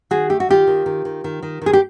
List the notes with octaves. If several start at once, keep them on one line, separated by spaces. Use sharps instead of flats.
D#3 F#4 G#4
A3 G4
F#4
D#3 F4 G4
D#3
D#3
D#3
D#3
D#3
D#3 G#4
G4